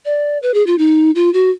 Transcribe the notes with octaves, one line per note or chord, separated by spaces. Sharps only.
D5
B4
G#4
F4
D#4
F4
F#4